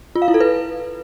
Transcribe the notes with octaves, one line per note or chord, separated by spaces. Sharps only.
F4
F5
E4
A4
B4